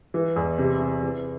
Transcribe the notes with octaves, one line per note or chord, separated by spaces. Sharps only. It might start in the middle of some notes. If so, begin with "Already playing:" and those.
E3
E2
C3
C3
E3